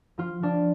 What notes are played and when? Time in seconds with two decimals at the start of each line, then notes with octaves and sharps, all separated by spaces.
0.18 F3 F4
0.43 F3 D4